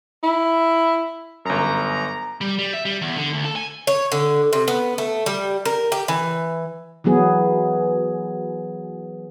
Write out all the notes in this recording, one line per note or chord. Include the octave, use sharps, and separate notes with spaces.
E4
G1 F#2 A#5
G3
G3
E5
G3
E2
D3
D2
A4
G#5
C#5
D3
C3
B3
A3
G3
A#4
G4
E3
E3 F#3 B3 G#4